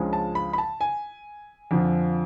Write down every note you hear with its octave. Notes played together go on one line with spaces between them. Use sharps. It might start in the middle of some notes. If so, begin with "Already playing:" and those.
Already playing: C#2 C#3 F3 G#3 D4
A5
B5
B5
A5
G#5
F2 D3 F3